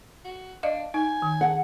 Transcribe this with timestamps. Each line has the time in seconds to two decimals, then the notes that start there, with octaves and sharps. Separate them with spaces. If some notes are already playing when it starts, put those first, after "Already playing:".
0.25 F#4
0.63 D4 D5 D#5 F5
0.94 D#4 G#5
1.22 D#3
1.41 G#4 F#5 A5